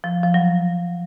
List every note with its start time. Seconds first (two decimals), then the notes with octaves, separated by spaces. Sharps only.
0.04 F3
0.23 F3
0.34 F#3